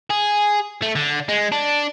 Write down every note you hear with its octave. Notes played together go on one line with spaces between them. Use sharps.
G#4
A3
D3
G#3
D4